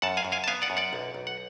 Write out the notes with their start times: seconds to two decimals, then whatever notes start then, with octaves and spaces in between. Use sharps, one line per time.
0.02 F#2 F#5 A5
0.17 F5 G#5
0.25 F#2
0.32 F5 G#5
0.44 A5
0.47 B3 F5 G#5
0.62 D5 F#5
0.70 F#2
0.77 D5 F#5
0.93 B1
1.14 B1
1.27 F#5